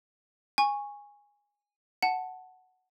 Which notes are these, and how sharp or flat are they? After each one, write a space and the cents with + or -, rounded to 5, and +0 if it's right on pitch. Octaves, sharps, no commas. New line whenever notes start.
G#5 -15 C#6 -5
F#5 +0 A5 +0